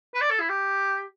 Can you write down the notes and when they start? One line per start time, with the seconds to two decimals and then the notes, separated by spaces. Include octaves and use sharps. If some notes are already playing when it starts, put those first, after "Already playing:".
0.14 B4
0.21 D5
0.30 A4
0.40 E4
0.49 G4